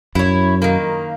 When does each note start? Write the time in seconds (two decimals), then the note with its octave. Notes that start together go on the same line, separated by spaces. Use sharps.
0.15 F#2 E4 C#5
0.62 D#3 A#3